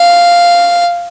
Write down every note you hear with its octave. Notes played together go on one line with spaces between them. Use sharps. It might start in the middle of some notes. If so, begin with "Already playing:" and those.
Already playing: F5